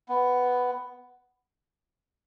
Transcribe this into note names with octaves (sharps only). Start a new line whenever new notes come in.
B3